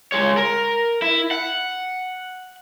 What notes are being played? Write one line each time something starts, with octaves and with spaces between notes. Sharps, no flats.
G#3 C#5
A#4
E4
F#5